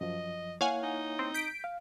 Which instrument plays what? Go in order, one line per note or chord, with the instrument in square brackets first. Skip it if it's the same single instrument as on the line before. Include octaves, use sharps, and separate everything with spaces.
[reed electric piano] F#2 F3 [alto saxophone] D#5
[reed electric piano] A#3 E4 C#5 [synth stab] F5 F#5 G#5
[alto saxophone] D#4
[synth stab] C4
G6 B6 D7
[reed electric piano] F5